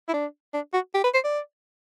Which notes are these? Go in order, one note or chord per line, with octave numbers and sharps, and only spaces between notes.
E4
D4
D4
F#4
G4
B4
C5
D5